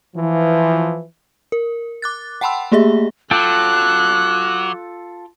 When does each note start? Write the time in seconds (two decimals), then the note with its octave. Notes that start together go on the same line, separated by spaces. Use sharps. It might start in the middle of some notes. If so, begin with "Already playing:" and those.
0.16 E3 F3
1.52 A#4
2.02 D6 F#6 A6
2.41 F#5 G5 A5 B5 C6 E6
2.72 A3 A#3 G4 G#4 E5
3.31 F#3 F4 A4 G5 D6 F#6